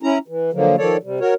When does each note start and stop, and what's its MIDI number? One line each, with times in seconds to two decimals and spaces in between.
0.03 0.18 61
0.03 0.18 64
0.03 0.18 82
0.28 0.51 52
0.53 0.76 50
0.53 0.76 53
0.53 0.76 54
0.53 0.76 58
0.78 0.97 51
0.78 0.97 53
0.78 0.97 69
0.78 0.97 73
0.78 0.97 74
1.03 1.20 48
1.03 1.20 55
1.20 1.34 66
1.20 1.34 70
1.20 1.34 73